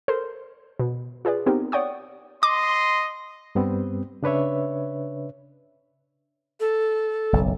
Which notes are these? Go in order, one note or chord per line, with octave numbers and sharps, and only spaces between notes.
A4 A#4 C5 C6
B2
F4 G#4 B4 D5
B3 C4 D#4 G4 A#4
C#5 D5 F#5 G5 C#6 D#6
D#5 C6 D6
G2 G3 B3 C4
C#3 D4 B4 C#5 E5
A4
F#1 B1